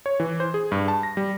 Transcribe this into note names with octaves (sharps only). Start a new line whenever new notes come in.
C#5
E3
C5
G#4
G2
A5
A#6
G3